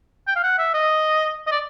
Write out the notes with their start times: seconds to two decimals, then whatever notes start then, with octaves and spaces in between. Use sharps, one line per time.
0.28 G5
0.36 F5
0.44 F#5
0.59 E5
0.74 D#5
1.47 D#5
1.52 D5